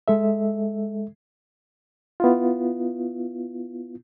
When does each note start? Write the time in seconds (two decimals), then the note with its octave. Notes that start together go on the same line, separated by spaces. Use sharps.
0.08 G#3 A4 E5
2.20 B3 E4 F4